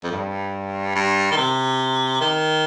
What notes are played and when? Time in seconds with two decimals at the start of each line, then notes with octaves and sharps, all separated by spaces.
0.04 F2
0.12 G2
0.95 G2
1.31 D#3
1.37 C3
2.21 D#3